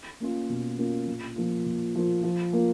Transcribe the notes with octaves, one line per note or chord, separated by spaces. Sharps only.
A#3 C#4 F4
B2
A#3 C#4 F4
A#2
F3 A#3 F4
A#2
F3 A#3 F4
F3
A#3 F4